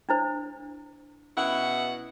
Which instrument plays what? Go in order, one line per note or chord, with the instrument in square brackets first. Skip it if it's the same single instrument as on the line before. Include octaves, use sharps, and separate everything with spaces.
[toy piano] D4 E4 C5
[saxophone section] B2 E4 F#5 [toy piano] C#4